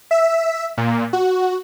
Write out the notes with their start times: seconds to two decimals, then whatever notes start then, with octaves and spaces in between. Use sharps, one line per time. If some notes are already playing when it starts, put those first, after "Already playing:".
0.11 E5
0.77 A#2
1.13 F#4